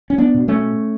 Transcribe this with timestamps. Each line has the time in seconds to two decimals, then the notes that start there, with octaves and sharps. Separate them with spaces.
0.10 C#4
0.18 B3 D4
0.34 B2
0.48 A3 C#4